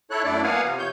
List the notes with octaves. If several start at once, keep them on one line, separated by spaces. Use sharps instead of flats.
E4 A4 C#5 F#6
F#2 A3 D4 E4 D5
A#3 B3 F5 F#5 G#5
C3 F3
C#5 G6